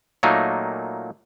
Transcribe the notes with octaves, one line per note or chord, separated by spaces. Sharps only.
A#2 F#3 A3 A#3 D#4